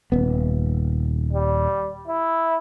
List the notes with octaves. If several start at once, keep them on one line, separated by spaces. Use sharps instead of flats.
D#1 B3
G3
E4